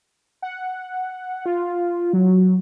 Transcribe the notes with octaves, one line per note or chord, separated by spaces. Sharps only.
F#5
F4
F#3